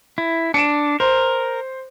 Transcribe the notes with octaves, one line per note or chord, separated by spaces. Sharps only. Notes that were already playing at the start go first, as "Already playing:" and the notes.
E4
D4 C#7 D7 E7
A#4 C5